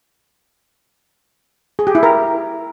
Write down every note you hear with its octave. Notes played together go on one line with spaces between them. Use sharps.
G#4
G4
E4
A#4